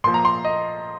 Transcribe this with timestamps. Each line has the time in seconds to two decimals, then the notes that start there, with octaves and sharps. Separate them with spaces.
0.04 A#2 F3 C6
0.14 A#5
0.25 C6
0.45 D#5